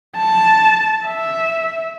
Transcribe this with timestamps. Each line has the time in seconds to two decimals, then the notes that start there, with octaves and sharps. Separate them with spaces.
0.17 A5
1.06 E5